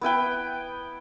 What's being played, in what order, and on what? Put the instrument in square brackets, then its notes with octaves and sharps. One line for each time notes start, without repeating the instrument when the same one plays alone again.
[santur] B3 E4 B4 G5